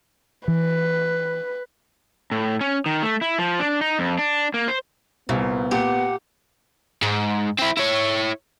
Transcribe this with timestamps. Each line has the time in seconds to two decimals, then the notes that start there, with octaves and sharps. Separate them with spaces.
0.48 E3 B4
2.31 A2
2.61 C#4
2.86 D#3
3.02 A3
3.21 E4
3.39 F3
3.60 D4
3.81 D#4
3.99 F2
4.18 D4
4.54 A#3
4.68 C5
5.29 C2 A#2 B3
5.71 A#2 G4 F#5
7.02 G#2
7.59 C4 E4
7.77 E4 C#5